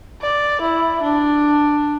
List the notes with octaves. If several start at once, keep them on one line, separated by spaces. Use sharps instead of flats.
D5
E4
D4